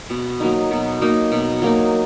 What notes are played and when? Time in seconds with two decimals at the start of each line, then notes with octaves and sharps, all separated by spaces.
0.10 B2
0.40 F#3 A#3 D#4
0.71 B2
1.01 F#3 A#3 D#4
1.32 B2
1.62 F#3 A#3 D#4